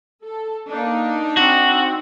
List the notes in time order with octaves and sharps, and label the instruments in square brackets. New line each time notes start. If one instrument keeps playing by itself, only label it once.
[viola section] A4
[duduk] A#3 [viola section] D4 D#4
[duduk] C4 [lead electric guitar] F#4